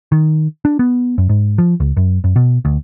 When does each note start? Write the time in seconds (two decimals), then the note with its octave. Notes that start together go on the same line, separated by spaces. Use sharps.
0.12 D#3
0.65 D4
0.79 B3
1.18 F#2
1.29 G#2
1.58 F3
1.80 C#2
1.97 F#2
2.24 F#2
2.36 B2
2.65 D2